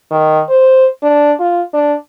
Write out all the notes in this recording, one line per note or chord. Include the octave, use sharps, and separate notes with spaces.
D#3
C5
D4
F4
D4